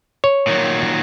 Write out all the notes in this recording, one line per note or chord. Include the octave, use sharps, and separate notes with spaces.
C#5
A#2 D#3 F#3